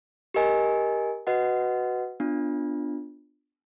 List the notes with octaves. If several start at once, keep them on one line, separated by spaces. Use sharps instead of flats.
G4 A#4 D#5 G#5
F#4 B4 D#5 F#5
B3 D4 F4